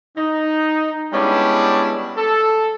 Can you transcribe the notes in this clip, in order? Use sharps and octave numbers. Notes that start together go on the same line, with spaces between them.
D#4
G3 G#3 B3 C#4 D4 E4
A4